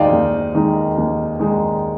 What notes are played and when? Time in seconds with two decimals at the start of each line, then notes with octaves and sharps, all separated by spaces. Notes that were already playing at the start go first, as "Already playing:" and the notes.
Already playing: D#2 D#3 G#3 D#4 D5 D#5 F5 G5
0.12 D#2
0.55 D#3 G#3 D#4
0.97 D#2
1.39 D#3 G#3 D#4